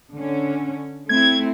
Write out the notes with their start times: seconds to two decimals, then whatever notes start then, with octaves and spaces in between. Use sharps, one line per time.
0.14 D3 C#4
1.09 A3 C4 E4 G#6